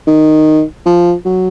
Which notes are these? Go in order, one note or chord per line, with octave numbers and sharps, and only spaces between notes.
D#3
F3
F#3